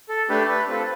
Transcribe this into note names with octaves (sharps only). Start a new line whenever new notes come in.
A4
A3 D4 G4 B4
B4
C4 F4 A4 B4